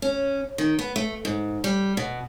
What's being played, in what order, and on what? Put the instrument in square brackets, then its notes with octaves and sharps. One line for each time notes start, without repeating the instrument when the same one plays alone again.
[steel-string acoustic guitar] C#4
D#3
B3
A3
G#2
G3
B2